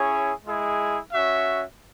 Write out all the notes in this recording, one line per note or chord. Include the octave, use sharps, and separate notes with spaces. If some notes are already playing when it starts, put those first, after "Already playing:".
Already playing: C#4 E4 G#4 C#5
G#3 E4 G#4
C#4 F#4 E5